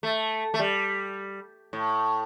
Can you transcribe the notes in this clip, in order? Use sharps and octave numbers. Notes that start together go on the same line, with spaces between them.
A3
A3
G3
A2